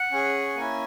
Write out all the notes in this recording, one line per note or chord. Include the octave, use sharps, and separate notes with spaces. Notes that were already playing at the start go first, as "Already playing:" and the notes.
Already playing: F#5
C#4 G#4
A#3 C#4 E4 G#5